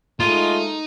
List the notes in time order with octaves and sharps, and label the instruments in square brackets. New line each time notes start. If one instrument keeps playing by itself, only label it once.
[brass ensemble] G#3 A3 [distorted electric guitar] D#4 [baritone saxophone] F4